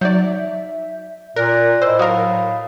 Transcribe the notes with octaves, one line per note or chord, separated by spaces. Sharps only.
F#3 D#4 D5 E5 G6
A#2 A#4 D5 F#6 A#6
A2 C5 D#5 E6
F#3 A#4 F5 D#6